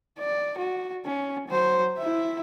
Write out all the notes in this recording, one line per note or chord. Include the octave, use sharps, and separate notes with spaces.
D5
F#4
C#4
F#3 C5
E4 E5